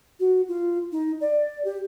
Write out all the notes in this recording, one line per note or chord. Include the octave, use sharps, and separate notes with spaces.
F#4
F4
D#4
D5
G4